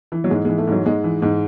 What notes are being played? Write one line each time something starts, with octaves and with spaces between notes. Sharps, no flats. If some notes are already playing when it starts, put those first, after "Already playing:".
E3
F#3
G#2 G#3
E3 G#3
A3
G#2 F#3
G#2 G#3
E3
G#2